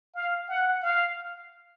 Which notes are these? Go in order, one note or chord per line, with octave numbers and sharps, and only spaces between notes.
F5
F#5
F5